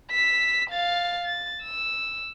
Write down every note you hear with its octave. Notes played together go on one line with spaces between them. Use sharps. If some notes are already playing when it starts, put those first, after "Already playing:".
E6 B6
F5 A6
A6
E6